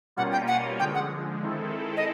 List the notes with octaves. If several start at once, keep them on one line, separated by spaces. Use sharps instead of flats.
B2 G3 A#3 C#4 F4 F#5
G5
F#5
D3 F3 G#3 G5
F#5
D#3 G#3 C4 E4 A4
D#5